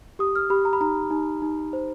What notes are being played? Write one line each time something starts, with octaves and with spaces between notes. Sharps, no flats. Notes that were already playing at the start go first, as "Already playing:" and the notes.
G4 D#6
F6
G4 B5
A#5
B5
D#4 A#5
D#4
D#4
C5